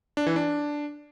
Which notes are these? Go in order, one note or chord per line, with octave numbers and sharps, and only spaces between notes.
D4
E3
D4